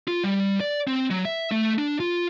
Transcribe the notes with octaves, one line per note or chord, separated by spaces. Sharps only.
F4
G3
D5
C4
F#3
E5
A3
D4
F4